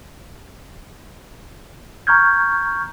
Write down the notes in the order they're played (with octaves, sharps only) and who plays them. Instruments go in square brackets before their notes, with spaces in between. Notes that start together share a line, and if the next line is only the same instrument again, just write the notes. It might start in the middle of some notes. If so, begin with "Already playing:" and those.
[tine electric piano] A#5 C#6 F6 G6 G#6